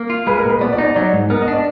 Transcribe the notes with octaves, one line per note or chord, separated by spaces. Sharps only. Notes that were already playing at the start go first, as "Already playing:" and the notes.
Already playing: A#3
F4
G#3 B4
A#4
A#2
B4
B3 D5
D5
D#4
D5
F#3 D5
G#2
B3 A#4
D#5
D4
D5